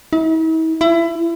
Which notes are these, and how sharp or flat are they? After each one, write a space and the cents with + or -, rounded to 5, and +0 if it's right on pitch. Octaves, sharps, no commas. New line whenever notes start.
E4 -45
E4 +25